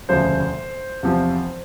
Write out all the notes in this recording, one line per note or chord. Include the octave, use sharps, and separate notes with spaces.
E1 D2 C#3 F3 C5
E2 C3 F3